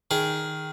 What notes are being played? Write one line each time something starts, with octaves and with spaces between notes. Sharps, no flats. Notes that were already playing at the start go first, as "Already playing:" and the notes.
D#3 G#4